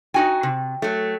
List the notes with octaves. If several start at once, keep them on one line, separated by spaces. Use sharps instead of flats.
D#4 F#4 G5 G#5
C3
F#3 A3